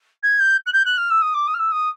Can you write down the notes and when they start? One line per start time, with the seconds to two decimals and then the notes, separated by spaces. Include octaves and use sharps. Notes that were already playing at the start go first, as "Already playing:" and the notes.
0.23 G#6
0.39 G6
0.66 F#6
0.73 G6
0.85 F#6
0.97 F6
1.10 E6
1.22 D#6
1.34 D6
1.47 D#6
1.54 F6
1.59 E6
1.72 D#6